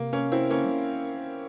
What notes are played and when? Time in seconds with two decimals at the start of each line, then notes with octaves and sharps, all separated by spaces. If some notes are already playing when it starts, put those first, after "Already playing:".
Already playing: C3 A#3
0.13 A#3 C#4
0.32 C4 E4
0.50 C#3 A#3 C#4
0.65 G3